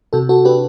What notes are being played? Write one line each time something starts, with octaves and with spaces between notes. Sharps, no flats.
C3 F#4 A4
F#4 A4
D4 G4 B4